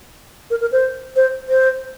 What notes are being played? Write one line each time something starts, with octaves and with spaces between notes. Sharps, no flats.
A#4
A#4
C5
C5
C5